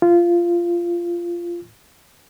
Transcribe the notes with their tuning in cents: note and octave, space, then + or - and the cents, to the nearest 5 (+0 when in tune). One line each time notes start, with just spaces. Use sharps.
F4 -15